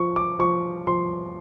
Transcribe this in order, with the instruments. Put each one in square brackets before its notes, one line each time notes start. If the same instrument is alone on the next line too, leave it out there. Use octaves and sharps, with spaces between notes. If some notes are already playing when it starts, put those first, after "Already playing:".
Already playing: [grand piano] F3 C#6
D6
F3 C#6
F3 C6